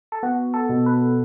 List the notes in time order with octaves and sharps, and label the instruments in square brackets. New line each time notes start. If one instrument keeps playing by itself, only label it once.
[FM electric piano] A4
[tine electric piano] B3 [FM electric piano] F#4
[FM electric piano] A4
[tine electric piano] B2
[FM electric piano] B4